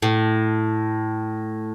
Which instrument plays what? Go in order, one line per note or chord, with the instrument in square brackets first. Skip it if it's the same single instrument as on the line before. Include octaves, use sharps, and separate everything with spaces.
[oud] A2